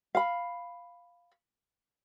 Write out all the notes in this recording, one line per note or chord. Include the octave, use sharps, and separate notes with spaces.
F5 B5